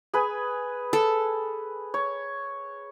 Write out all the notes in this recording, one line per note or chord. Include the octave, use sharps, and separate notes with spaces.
G#4 B4 G#5
A4
C#5